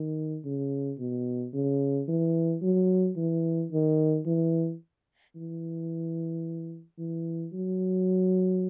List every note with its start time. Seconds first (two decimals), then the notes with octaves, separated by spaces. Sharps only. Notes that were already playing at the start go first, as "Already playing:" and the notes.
Already playing: D#3
0.45 C#3
0.99 B2
1.53 C#3
2.08 E3
2.62 F#3
3.17 E3
3.72 D#3
4.26 E3
5.35 E3
6.98 E3
7.53 F#3